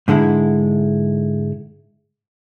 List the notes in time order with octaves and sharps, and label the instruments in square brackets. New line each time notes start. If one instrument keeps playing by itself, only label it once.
[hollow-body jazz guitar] G#2 D3 G#3 E4